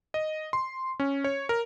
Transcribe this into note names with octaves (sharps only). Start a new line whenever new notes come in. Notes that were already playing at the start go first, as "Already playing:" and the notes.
D#5
C6
C#4
C#5
A#4